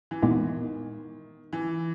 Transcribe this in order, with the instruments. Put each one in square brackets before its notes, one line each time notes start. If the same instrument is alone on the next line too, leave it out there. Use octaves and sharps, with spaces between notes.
[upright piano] E3
[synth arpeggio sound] A#2 G#3 B3 E4 G4 [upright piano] D#3
[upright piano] E3